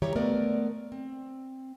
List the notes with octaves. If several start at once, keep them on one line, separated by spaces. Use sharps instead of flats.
D#3 E3 G3 G4 C#5 A#5
G#3 A3 B3 A#4 D5
C4